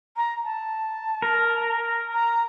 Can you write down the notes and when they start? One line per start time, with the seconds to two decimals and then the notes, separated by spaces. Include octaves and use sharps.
0.17 A#5
0.44 A5
1.22 A#4
2.13 A#5